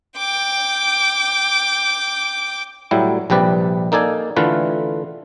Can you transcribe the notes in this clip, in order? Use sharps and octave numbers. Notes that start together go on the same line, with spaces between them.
G5 D6
A2 F#3 G3 E4
A#1 C3 G3 B4 D5
A#3 D#4 A4 D5 G#5
D3 E3 A3 F4 B4